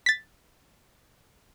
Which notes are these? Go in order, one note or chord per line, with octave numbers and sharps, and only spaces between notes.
A6 B6